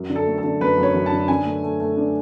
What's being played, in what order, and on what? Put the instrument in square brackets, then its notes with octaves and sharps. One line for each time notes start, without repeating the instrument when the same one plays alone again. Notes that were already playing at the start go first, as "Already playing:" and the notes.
Already playing: [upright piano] F#2
D3
[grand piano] A4
[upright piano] A3
[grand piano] A4
[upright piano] D3
[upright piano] F#2 [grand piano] B4
[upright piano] F#2 [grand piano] C#5
[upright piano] F#2
[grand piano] A5
[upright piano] D3
[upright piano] D3 [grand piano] G#5
[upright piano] A3
A3
A3
D4